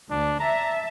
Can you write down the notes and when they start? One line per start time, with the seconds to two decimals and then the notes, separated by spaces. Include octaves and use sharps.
0.11 D2 D4
0.40 E5 A5 A#5